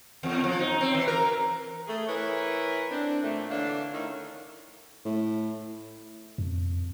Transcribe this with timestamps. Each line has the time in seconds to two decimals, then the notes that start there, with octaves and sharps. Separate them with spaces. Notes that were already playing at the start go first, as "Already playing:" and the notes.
0.23 E2
0.44 F3
0.59 D#4
0.81 C4
0.94 E3
1.08 A#4
1.87 A3 G#4
2.07 E3 E4 A#4 B4 C#5
2.90 C4 D4
3.23 A#2 A3
3.49 D3 E3 D4 C#5 F5
3.92 D#3 A3 C#4 D#4 E4
5.05 A2
6.38 F2